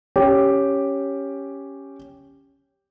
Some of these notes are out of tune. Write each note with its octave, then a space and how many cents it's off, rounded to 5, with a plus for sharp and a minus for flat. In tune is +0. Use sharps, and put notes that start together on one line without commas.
C#4 +0 G4 +0 G5 +0